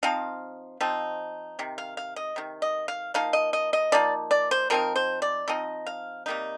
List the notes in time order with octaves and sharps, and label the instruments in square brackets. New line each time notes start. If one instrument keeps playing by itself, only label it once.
[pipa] F3 C4 D#4 F5
F3 C4 D#4
C3 D#3
F5
F5
D#5
C3 D#3
D#5
F5
F3 A#3 D#4 F5
D#5
D#5
D#5
F3 A#3 D#4 D5
D5
C5
F3 C4 D#4 A#4
C5
D5
F3 C4 D#4 D#5
F5
C3 G3 A#3 D#4